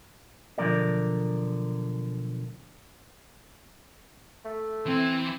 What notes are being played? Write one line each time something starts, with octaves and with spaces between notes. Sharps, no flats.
B1 D3 F3 C#4 A#4 D5
A3
E3 C4